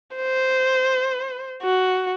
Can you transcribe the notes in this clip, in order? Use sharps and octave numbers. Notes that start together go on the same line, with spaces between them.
C5
F#4